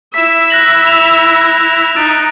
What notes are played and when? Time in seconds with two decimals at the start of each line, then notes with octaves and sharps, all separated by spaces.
0.14 E4 E5 B6 E7
0.50 F#6 A#6 F#7
0.87 F7
1.96 D#4 F#6 A6 D7